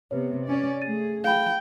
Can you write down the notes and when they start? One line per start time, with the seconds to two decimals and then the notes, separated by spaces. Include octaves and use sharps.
0.11 C3 B3 B4 C#5
0.46 C#4 D5
0.82 A3 G#4 A6 D#7
1.24 F5 G5 B5